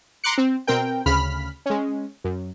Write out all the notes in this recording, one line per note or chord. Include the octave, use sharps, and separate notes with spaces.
A#5 C6 D6 F#6 C#7
C4
B2 C4 A#4 G5
D2 C#3 B5 F6 B6
G#3 C#4
F#2